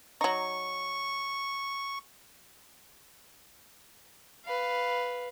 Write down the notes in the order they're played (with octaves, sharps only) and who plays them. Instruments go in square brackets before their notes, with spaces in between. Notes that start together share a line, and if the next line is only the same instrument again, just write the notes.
[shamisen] F#3 D#4 [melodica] C#6
[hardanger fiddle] B4 F5